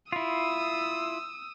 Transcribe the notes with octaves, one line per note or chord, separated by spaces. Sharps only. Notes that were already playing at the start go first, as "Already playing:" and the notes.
E4 F4 D#6 E6